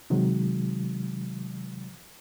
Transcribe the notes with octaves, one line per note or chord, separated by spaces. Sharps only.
C3 D#3 F#3 G#3